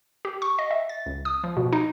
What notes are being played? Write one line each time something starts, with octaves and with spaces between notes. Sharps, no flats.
G4
C#6
D#5
E5
A6
C#2
D#6
F3
B2
D#4